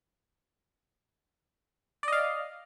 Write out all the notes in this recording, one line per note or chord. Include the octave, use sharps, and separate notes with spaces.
D5 D#5 F5